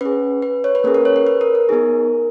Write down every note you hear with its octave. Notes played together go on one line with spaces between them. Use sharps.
C#4 G#4 B4
B4
C#5
B4
A#3 C#4 G#4 A#4
A#4
C#5
B4
B4
A#4
A#4
B3 D#4 G#4 A#4